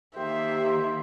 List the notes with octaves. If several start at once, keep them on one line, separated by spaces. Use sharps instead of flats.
D#3 A#3 G4 C5 E5